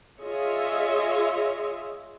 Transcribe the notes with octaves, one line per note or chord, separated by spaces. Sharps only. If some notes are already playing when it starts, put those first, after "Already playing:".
F4 G#4 C#5 D#5 E5